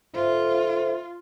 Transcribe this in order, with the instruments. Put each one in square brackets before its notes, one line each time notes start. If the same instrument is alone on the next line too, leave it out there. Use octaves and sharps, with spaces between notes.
[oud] G#2 D3 A3 [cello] F4 [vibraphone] C5 E5